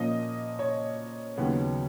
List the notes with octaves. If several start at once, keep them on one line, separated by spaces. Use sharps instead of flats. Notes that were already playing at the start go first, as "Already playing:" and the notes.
Already playing: A#2 F3 A#3 C#4 D#5
C#5
D#2 C#3 F#3 B3 D#4